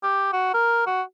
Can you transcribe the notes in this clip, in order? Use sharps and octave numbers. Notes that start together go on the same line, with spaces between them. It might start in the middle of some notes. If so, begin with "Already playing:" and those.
G4
F#4
A#4
F#4